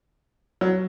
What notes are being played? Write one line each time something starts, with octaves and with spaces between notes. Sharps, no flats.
F#3